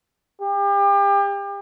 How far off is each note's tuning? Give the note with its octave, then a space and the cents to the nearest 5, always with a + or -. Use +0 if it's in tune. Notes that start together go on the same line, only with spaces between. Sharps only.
G4 +35